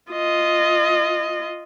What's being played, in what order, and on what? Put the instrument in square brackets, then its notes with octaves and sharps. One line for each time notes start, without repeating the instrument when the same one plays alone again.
[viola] F4 D#5